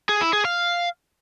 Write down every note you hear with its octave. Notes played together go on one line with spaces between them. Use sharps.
G#4
E4
G#4
F5